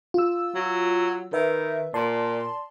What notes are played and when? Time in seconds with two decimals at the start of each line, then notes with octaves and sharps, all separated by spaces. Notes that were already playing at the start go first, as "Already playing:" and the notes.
0.14 F4 E6
0.55 F#3
1.33 D#3 B4 E5
1.94 A#2 D5 A5 C6